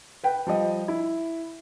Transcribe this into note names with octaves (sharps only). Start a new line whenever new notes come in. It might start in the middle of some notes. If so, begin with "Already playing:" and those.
B4 G5
F3 G3 D#5
E4